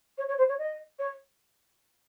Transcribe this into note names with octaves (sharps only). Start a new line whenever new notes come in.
C#5
C#5
C5
C#5
D#5
C#5